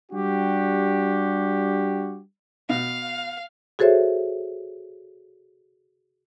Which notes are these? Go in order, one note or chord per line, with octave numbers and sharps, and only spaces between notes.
G3 D4 F#4 G4
B2 F5
F#4 G#4 A4 C5 C#5 E5